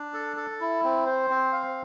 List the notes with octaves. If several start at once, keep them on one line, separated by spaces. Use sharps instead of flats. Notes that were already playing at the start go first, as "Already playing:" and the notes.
Already playing: D4
A4
A4
E4
C4
C5
C4
F5